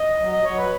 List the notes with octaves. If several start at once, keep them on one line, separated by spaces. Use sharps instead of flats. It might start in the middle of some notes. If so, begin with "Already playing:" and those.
Already playing: D#5
F#3
D#5
F#3 C#5
B4